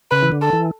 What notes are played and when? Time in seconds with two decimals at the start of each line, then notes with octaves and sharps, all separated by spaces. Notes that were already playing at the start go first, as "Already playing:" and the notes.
0.11 C#3 B4
0.22 E3
0.32 D3
0.42 A4
0.53 E3